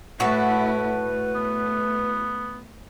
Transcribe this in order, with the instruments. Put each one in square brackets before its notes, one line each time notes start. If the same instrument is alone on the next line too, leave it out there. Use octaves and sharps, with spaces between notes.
[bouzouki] A2 F#4 A4 [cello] A3 E4 [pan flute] B4
[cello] A3
[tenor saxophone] B3